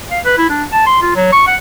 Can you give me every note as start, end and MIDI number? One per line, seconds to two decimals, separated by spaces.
0.11 0.19 77
0.25 0.36 71
0.38 0.48 64
0.49 0.64 62
0.72 0.83 81
0.86 1.00 84
1.02 1.12 65
1.16 1.29 54
1.32 1.42 85
1.47 1.56 78